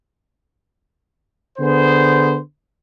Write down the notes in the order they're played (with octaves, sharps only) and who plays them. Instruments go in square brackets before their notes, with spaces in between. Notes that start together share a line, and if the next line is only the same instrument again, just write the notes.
[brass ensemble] D3 B3 G#4 C5